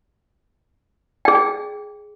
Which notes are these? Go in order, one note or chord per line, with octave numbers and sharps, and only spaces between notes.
G#4 G5